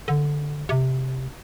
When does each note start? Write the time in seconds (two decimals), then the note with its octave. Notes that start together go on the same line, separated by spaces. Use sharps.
0.08 D3
0.69 C3